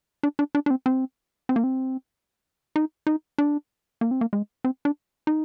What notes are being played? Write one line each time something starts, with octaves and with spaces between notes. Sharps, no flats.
D4
D4
D4
D4
C4
C4
C4
A#3
C4
D#4
D#4
D4
A#3
C4
A#3
G#3
C4
D4
D#4